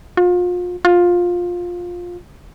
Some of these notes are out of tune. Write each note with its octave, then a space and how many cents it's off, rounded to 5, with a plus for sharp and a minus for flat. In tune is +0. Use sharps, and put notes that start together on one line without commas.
F4 +35
F4 +15